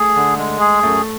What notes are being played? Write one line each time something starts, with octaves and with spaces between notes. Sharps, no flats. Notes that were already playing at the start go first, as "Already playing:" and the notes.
Already playing: A3 G#4
D3
G#3
G#4
F#2 A3